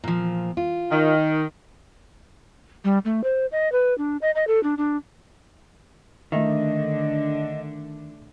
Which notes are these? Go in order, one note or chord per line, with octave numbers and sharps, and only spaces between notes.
A#2 F3
F4
D#3
G3
A3
C5
D#5
B4
D4
D#5
D#5
A4
D4
D4
D3 D#3 A3 D4 D#5 E5